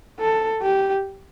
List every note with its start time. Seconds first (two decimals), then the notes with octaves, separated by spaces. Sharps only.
0.20 A4
0.62 G4